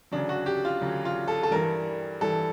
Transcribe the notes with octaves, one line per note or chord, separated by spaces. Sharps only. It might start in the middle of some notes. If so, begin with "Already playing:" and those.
D2 C#3 F#3 D4
F#4
G4
F4
D2 C#3 F#3
F4
A4
A4
G2 E3 G3 A#4
G2 E3 G3 A4